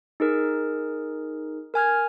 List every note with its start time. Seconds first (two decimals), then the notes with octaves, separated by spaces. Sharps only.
0.20 D#4 G#4 A#4
1.74 A#4 G#5 F6 G#6